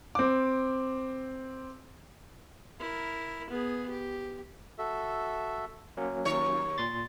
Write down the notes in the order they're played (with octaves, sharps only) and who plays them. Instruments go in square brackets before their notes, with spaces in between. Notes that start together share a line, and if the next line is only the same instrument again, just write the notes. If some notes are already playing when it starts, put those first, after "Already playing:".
[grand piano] C4 D6
[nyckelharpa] E4 A#4
B3 G#4
G4
[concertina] F#4 A4 E5
[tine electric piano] F#3 A#3 C#4
[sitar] D#2 C#5
[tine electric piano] A#2 C6 A6